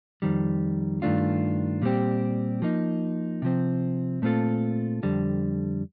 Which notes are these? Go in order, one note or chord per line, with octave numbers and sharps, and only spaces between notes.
F2 D#3 G3
G2 D#3 A3 D4 F4
A#2 G3 C4 G4
F3 A#3 D#4
C3 F3 C4
A#2 A3 C4 F4 A4
F2 D3 G3